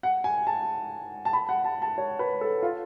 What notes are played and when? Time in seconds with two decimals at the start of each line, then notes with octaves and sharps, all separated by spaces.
0.03 F#5
0.24 G#5
0.47 A5
1.25 A5
1.33 B5
1.49 F#5
1.64 A5
1.82 A5
1.98 C#5
2.19 B4
2.41 A4
2.62 F4